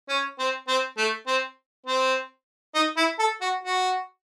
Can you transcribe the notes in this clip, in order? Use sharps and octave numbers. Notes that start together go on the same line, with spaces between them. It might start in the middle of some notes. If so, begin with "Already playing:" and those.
C#4
C4
C4
A3
C4
C4
D#4
E4
A4
F#4
F#4